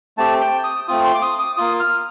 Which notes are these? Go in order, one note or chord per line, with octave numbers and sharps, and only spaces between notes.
A3 C4 G4 A5
G5
D#6
A3 C4 F4 D#6
C6
D6
D#6
D#6
A#3 F4 D#6
F6